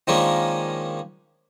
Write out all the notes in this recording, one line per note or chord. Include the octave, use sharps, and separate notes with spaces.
D#3 F3 G#3 A#3 C#4 D4